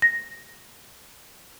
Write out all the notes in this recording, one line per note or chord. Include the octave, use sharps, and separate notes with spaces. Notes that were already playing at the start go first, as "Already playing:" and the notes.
A#6